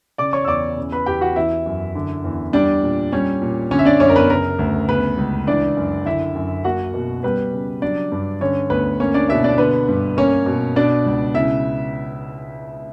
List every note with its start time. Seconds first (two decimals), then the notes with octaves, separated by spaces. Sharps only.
0.18 C#3 D5 D6
0.33 C#5 C#6
0.45 E6
0.48 E2 D5 D6
0.77 C#3
0.92 B4 B5
1.06 E2 G4 G5
1.21 F#4 F#5
1.36 E3 E4 E5
1.66 F#2
1.95 D3
2.24 E2
2.53 G3 D4 D5
2.83 A#2
3.12 G3 C#4 C#5
3.42 A#2
3.71 D3 C#4 C#5
3.79 E5
3.85 D4 D5
4.00 F#2 C#4 C#5
4.09 A#4
4.16 B3 B4
4.30 C#3 A#4
4.59 D2
4.88 C#3 B3 B4
5.18 C#2
5.47 E3 D4 D5
5.77 F#2
6.06 D3 E4 E5
6.35 F#2
6.64 A#3 F#4 F#5
6.94 B2
7.23 G3 B3 B4
7.52 C#3
7.82 F#3 D4 D5
8.12 G2
8.41 D3 C#4 C#5
8.70 D2 B3 B4
9.00 A#3 C#4 C#5
9.14 D4 D5
9.29 B2 E4 E5
9.44 D4 D5
9.58 D3 B3 B4
9.88 G2
10.17 A#3 C#4 C#5
10.46 B2
10.76 B2 D4 D5
11.06 C#2
11.34 C#3 E4 E5